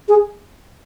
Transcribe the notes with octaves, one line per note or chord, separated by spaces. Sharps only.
G#4